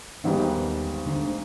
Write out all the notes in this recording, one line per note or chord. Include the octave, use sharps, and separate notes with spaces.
G#1 D#2 G#2 D#3 G3 B3
D2 D3